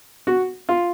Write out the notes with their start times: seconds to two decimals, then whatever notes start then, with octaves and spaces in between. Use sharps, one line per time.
0.27 F#4
0.69 F4